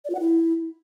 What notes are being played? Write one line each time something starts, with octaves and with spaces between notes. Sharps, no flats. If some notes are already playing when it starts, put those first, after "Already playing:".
D5
F4
F#5
E4